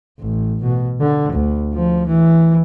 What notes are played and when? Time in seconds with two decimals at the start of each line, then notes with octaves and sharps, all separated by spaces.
0.20 A1
0.63 B2
1.00 D3
1.33 D2
1.73 F3
2.07 E3